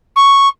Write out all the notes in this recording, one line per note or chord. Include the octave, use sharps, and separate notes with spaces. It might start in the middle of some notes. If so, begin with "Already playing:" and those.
C#6